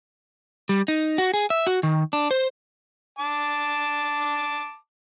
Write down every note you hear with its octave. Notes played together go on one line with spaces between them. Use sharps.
G3
D#4
F#4
G#4
E5
F#4
D#3
D4
C5
A5 D6